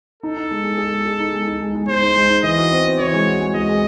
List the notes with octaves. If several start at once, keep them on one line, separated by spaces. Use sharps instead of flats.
D#4 A4
D#4
G#3
G#3
G#4
G#3
G#4
D#4
G#3
D#4
G#3
G#3
G#3 C5
D#4
G#3
D#4
E3 D#5
F#4
C4
C4
E3 C#5
G#3
F#4
G#3
G#3 D#5
G#3